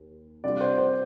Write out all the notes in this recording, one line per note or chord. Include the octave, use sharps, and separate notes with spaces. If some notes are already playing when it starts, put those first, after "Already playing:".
Already playing: D#2
C3 G3 D4 F4 D5
C5
C5